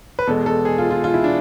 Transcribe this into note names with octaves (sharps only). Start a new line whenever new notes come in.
B4
E2 B2 G#3 A4
A4
G#4
F4
F4
F4
E4
D4